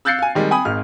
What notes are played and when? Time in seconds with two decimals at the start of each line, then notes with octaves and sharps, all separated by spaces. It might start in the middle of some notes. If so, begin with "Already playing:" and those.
0.05 E6 F#6 G6 A6 C7 C#7
0.19 F5 G#5
0.35 D#3 G3 G#3
0.51 G5 G#5 B5 D#6
0.65 G#1 G#2 F6